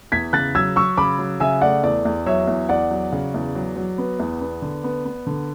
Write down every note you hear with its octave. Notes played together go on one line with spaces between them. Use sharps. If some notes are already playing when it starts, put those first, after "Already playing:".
E2 G#6 B6
C#3 F#6 A6
F#3 E6 G#6
F#3 C#6 E6
C#3 B5 D6
F#3
C#3 E5 G#5
A3 D5 F#5
E2 D5
E2
F#3 C#5 E5
E2
E2 D5 F#5
F#3
C#3
E2
F#3
F#3
B3
E2
B3
D3
B3
B3
D3